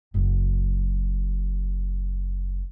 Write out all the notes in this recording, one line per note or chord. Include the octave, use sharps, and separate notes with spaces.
F#1 F#3